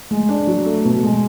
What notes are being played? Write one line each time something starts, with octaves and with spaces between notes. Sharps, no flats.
G#3
D4
F#3
A3
B2
G#3